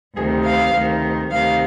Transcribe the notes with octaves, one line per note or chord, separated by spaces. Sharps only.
D2 C3 D#3 G#4
F5
D2 C3 D#3
D2 C3 D#3 F5